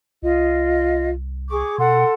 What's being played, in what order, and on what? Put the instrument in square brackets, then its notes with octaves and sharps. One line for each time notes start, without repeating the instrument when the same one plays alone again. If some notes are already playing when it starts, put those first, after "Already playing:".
[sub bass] C2 [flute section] F4 D#5
[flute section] G#4 C#6 D6
[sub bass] B2 [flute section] A4 F#5 C6